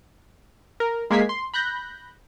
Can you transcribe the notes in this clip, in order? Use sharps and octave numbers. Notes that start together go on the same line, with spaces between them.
A#4
G#3 A#3 G#6 B6 C7
C6
B5 F#6 G6 A#6